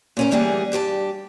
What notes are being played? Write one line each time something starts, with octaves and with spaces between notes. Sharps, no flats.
A#2 C#4 A#4
D2 E3 G3 A#3 G#4 F#5
G2 G4 C5 A5